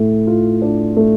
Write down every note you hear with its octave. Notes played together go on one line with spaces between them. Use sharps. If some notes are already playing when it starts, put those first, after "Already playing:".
Already playing: A2 A3
F4
D4
A3